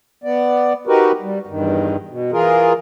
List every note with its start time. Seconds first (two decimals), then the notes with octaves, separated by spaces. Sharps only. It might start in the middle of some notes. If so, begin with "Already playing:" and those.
0.24 B3 D5
0.87 D#4 F#4 G4 A#4 B4
1.21 G3
1.47 E2 G2 D#3
2.09 B2
2.32 E3 F4 G#4 A#4